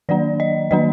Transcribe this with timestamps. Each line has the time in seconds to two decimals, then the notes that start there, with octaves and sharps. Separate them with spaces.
0.09 D#3 F#3 A#3 D4 D5
0.40 D#5
0.71 D#3 F#3 A#3 D4 D#5